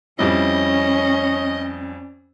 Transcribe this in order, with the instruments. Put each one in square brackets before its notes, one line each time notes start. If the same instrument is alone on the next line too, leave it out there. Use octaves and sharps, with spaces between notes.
[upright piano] F2 G3 E4 [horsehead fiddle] C#4 [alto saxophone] C#5 [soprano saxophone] D#5